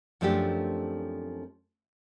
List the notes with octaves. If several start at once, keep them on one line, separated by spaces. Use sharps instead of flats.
F#2 F3 A3 C4 D4 G4